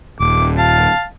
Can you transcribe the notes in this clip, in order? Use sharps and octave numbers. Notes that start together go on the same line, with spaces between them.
D#1 D6
F5 A5